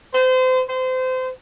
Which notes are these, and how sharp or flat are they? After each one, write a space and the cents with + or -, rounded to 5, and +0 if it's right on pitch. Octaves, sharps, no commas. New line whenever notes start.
C5 -30
C5 -30